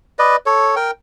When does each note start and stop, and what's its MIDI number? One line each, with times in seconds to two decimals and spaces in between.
0.19 0.36 71
0.19 0.36 74
0.19 0.36 75
0.46 0.75 69
0.46 0.75 73
0.76 0.91 70
0.76 0.91 79